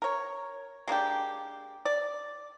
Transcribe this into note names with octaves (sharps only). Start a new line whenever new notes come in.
A#4 C#5
G#3 A#3 D4 G4
D5